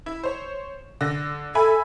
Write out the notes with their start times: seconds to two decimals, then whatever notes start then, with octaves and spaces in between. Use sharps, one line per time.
0.06 E4
0.23 C5 C#5
1.01 D3 A#6
1.55 A4 E5 G#5 B5